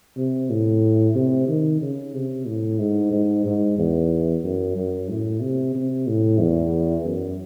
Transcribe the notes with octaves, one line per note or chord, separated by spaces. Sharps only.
C3
A2
C3
D#3
C#3
C3
A2
G#2
G#2
G#2
E2
F#2
F#2
A2
C3
C3
A2
E2
F#2